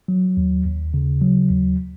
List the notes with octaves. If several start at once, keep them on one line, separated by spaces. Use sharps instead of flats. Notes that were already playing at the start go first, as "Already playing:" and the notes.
F#3
D#2
D#2
C#3
F#3
D#2